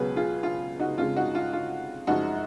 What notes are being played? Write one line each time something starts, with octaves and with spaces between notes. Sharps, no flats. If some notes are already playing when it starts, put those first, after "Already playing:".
Already playing: C#2 B2 F#3 G#4 B4
F4 G#4
F4
D#4 F#4
F2 C#3 G#3 F4
D#4 F#4
F4
F4
F#2 F3 G#3 D#4 F#4